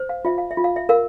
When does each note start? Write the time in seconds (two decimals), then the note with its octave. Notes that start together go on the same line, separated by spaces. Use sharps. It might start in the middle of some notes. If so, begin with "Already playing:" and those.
Already playing: C5
0.09 F5
0.25 F4 E5
0.38 F5
0.51 E5
0.57 F4
0.64 F5
0.76 E5
0.89 A#4 F5